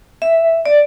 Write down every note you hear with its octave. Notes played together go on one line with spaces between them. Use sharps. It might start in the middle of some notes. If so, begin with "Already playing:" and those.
E5
D5